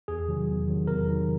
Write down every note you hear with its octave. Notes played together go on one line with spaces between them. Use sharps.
E2 G#4
C3 D#3 F#3
E2
C3 D#3 F#3
E2 A#4
C3 D#3 F#3